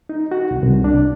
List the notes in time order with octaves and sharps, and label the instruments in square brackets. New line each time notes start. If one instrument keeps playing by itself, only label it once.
[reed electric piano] D#4
F#4
C2
C2
D4